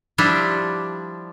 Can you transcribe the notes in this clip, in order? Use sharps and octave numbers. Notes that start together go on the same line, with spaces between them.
F3 G3 D4 E4